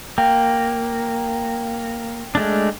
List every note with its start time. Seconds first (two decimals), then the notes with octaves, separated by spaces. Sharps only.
0.18 A#3 G5
2.35 G#3 A3 D4